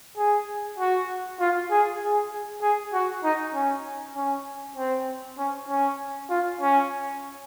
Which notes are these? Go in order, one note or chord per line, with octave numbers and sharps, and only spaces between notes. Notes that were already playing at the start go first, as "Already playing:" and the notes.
G#4
F#4
F4
G#4
G#4
G#4
F#4
D#4
C#4
C#4
C4
C#4
C#4
F4
C#4